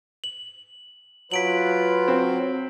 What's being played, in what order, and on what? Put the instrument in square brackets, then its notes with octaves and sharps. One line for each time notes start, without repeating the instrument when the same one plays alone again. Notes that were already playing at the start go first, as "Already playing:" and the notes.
[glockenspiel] F#7
[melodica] F#3 [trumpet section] F4 B4 [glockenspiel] B6 D7 F#7
[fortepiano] C4